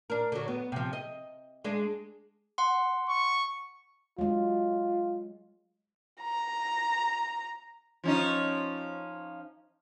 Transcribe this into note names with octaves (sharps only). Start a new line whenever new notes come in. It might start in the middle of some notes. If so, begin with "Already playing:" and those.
D4 A#4
D3 F#3
B3
C3 F3
D#5
G#3 D4 G#4
F#5 C6
C#6
F#3 G#3 F4
A#5
F3 C#4 D#4